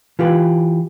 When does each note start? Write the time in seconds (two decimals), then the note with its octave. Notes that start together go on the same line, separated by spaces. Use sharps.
0.19 E3 F4 G4 B4